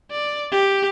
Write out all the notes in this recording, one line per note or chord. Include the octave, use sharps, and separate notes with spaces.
D5
G4